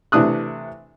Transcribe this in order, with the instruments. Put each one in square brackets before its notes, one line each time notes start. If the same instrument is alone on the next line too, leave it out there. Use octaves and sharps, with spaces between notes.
[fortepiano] C3 E3 A3 D4 D#6 F#6